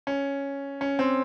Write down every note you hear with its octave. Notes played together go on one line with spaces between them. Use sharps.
C#4
C#4
C4